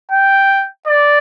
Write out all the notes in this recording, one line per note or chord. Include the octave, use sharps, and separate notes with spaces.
G5
D5